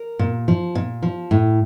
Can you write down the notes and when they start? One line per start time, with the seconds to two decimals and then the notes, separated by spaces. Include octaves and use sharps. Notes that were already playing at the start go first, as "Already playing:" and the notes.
Already playing: A#4
0.19 A#2
0.48 F3
0.75 A#2
1.03 F3
1.31 A2